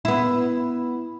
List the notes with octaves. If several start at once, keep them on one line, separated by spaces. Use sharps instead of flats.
B3 E4